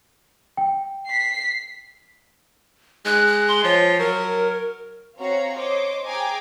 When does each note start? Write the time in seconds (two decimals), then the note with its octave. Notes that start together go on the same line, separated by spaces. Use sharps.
0.57 G5
1.06 B6 C7
3.05 G#3 F#6
3.27 F#6
3.48 C6
3.64 F3 C#5
3.99 F#3 A#4
5.18 C4 F#4 C#5 F5 A#5
5.55 C5 C#5 D#5 D6
6.06 G#4 G5 G#5 A#5 D6